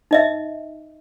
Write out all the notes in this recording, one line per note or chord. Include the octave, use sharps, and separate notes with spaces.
D#4 D#5 E5